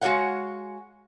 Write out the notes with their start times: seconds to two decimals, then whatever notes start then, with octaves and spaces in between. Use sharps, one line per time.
0.01 G#3 F#4 A4 C#5 F5 F#5